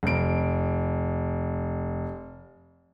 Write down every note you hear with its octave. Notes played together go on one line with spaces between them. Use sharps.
F1 D7